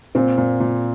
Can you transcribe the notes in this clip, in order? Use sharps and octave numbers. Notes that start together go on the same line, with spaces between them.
A#2 C4
A#2
A#2